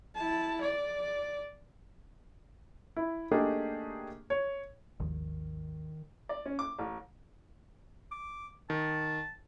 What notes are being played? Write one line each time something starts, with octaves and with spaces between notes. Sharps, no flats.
E4 A5
D5
E4
A3 A#3 D4 D#4 G4 G#4
C#5
G#1 D#2 D#3 F3
D5
C#4
D6
A1
D6
D#3 A5